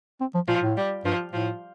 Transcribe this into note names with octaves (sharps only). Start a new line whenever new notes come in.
C4
F3
A#2 F3
A2
G3
G2 F3
A2 F3